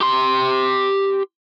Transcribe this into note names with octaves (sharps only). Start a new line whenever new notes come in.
G4 C6